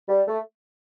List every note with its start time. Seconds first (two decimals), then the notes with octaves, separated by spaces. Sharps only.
0.08 G3
0.27 A3